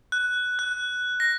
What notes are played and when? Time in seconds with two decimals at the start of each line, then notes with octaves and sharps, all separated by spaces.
0.12 F#6
0.59 F#6
1.20 A#6